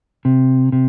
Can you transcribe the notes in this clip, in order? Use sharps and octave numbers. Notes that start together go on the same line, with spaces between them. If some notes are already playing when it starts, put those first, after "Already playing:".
C3
C3